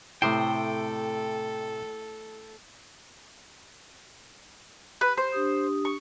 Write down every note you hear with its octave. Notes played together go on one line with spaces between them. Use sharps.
A2 C3 A3 E4 A4 C5 G5 D#6
B4
C5
D4 G4 D#6
C#6